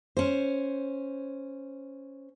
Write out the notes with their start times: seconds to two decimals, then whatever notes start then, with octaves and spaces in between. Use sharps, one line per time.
0.17 C#4 C5